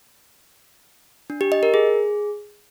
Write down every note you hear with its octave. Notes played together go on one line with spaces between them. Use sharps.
D4
G4
D#5
A#4
G#4